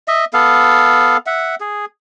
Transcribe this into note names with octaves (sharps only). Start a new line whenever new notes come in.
D#5 E5
B3 A4 F5
E5 F#5
G#4